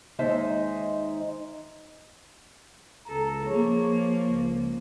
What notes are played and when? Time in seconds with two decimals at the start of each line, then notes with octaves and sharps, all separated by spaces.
0.19 D#2 G#3 D#4 C5 D#5 E5
3.07 C#2 A4 A#5
3.48 F3 A#3 G#4 C#5
4.27 C#2